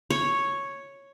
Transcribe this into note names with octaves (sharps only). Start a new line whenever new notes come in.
C#5